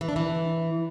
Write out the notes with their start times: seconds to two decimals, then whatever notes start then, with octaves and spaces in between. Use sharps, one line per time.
0.01 E3
0.08 D4
0.16 E3